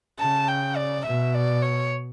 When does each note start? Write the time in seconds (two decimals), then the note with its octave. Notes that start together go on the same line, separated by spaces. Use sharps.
0.19 C#3 A5
0.48 G5
0.76 D5
1.05 B2 E5
1.34 D5
1.62 C#5